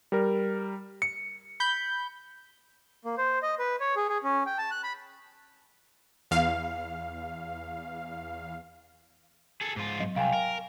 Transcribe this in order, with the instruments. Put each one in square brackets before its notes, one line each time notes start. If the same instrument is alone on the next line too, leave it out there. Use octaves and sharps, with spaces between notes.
[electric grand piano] G3 A#4
C#7
[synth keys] B5 G6
[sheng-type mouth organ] A#3
C5
D#5
B4
C#5
G#4
G#4
C#4
G5
A5
F#6
B5
[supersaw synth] E2 F5
[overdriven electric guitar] G#4 A4
G#2 F4
[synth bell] F#3
[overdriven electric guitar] C2 [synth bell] F5 G5 G#5
[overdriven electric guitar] A#4